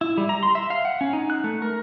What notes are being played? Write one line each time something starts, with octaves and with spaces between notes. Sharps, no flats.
E4
G3
A#5
C6
E5
F5
F#5
C#4
D#4
F#6
A3
A#4